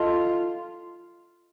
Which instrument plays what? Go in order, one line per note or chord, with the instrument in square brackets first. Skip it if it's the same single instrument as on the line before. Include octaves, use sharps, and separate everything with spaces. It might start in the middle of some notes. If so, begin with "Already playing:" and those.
Already playing: [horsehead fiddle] F4 [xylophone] A4 D#5 A5 C6